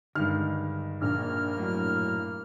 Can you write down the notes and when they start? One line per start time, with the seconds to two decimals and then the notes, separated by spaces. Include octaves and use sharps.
0.15 G2 D3 D#3 G#3 F6
1.01 A#1 A#3 F6
1.58 A2 F#3